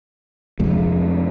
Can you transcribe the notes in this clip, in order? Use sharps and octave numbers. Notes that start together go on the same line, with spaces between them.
F2 C3 G#3